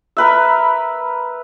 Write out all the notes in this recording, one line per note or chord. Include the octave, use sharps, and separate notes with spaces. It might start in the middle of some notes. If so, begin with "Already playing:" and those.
A#4 B4 E5